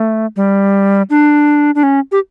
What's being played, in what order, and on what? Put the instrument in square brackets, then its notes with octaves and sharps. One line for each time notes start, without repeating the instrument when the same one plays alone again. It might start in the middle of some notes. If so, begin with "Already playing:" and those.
Already playing: [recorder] A3
G3
D4
D4
C#4
G4